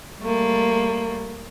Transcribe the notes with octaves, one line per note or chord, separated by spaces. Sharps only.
G3 A3 A#3